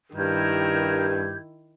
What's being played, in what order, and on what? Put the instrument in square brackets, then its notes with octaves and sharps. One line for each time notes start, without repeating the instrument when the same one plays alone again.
[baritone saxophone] G2 [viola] D#3 E4 [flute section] G4 G6 G#6 [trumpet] A#4